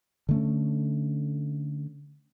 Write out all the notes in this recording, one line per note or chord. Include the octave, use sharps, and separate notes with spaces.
D3 A3 C#4